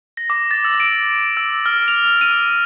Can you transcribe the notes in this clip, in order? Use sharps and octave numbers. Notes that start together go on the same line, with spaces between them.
A#6
D6
A6
E6
D7
E6
F6
F7
D#7